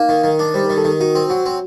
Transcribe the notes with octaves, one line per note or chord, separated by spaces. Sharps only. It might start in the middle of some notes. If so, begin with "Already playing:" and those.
Already playing: A#3 D#4
D#3
D#3
D4
G3 C5
D#3 A#4
A4
D#3 G4
D#4 F#4
C4
F#3
C4